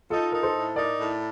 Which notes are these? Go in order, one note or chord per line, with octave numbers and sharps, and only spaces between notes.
D#4 F4 A4
D#4 A#4
A4 C5
A2
D#4 A#4 D5
A2